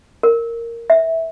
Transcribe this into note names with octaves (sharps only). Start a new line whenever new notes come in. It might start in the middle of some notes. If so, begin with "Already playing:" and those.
A#4
E5